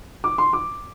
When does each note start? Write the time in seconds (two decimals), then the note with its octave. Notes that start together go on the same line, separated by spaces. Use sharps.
0.24 D6
0.38 C6
0.53 D6